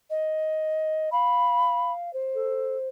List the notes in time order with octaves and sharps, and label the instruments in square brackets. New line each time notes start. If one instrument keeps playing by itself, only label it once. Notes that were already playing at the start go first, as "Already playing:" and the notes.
[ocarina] D#5
[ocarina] F5 [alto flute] B5
[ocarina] C5
[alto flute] A4